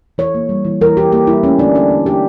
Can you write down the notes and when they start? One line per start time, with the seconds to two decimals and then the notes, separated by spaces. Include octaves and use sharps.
0.18 E3 C#5
0.35 A#3
0.49 G3
0.65 E3
0.81 E3 A#4
0.97 E3 G4
1.12 A#3 G4
1.27 G3 E4
1.43 A3 C#4
1.59 D3 D4
1.75 D3 D4
1.90 D3
2.06 D3 G4